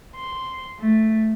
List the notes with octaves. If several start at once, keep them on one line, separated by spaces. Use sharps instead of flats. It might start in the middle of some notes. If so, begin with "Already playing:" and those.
C6
A3